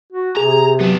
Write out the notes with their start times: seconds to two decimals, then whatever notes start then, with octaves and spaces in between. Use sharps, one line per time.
0.12 F#4
0.37 C3 G#4 A#5
0.81 F#3 B3 D4